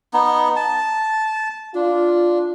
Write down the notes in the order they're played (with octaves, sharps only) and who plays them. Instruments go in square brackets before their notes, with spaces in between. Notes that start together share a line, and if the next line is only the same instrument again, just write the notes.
[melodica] B3 D#4
A5
[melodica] D4 [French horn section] F4